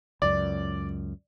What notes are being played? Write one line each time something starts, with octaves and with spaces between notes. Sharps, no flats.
C#2 F#2 D5